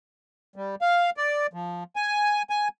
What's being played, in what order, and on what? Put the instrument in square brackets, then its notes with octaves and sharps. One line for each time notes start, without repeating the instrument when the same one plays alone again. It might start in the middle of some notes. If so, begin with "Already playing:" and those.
[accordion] G3
F5
D5
F3
G#5
G#5